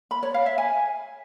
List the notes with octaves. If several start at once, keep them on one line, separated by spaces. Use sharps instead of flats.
B5
C#5
F5
E5
G#5